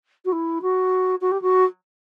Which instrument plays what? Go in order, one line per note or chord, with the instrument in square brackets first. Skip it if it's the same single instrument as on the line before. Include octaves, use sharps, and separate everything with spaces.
[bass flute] F#4
E4
F#4
F#4
G4
F#4